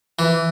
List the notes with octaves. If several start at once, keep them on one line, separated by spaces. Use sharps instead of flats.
E3